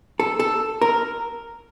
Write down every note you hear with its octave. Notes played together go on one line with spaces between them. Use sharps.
A4
A4
A#4